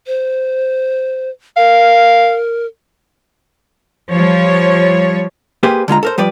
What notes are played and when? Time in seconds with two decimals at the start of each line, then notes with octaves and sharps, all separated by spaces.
0.07 C5
1.57 A#4 F5
4.12 F3 G3 C#5
5.63 A#3 G4 G#4 B4 C5
5.88 D3 G#3 F4 A#5
6.03 A4 A#4 C5
6.18 F3 G3 B4 D5